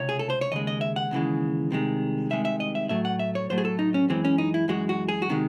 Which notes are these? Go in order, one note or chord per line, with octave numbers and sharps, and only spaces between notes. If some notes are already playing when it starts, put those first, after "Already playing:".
Already playing: C#2 C3 C#5
G#4
A4
C5
C#5
D#2 C#3 G#3 D#5
D#5
E5
F#5
D#2 C#3 E3 G#3
C2 C3 D#3 G#3
C2 C3 D#3 G#3 E5
E5
D#5
E5
A2 F#3 A3 E5
F#5
E5
C#5
A2 F#3 A3 C5
G#4
A4
D#4
C#4
F#2 E3 G#3 C4
C#4
D#4
E4
F#2 E3 G#3 F#4
F#4
G#4
F#4
C3 D#3 G#3